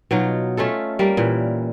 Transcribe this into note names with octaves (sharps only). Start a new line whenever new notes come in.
B2 F#3 D#4 F4
A3 C#4 F4 A4
G3 A#3
A#2 E3